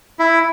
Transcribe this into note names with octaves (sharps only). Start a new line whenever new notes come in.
E4